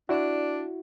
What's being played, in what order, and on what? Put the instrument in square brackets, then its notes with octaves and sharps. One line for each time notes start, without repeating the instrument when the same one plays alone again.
[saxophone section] D4 [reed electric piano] E4 F#4